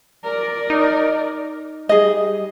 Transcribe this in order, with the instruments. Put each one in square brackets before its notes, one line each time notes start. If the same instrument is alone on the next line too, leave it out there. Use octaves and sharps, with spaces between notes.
[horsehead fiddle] A#4 D5
[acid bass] D#4
[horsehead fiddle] G3 [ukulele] G#4 D#5